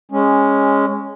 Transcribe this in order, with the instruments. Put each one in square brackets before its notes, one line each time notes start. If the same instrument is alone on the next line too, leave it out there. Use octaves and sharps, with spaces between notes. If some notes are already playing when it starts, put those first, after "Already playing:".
[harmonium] G#3 C#4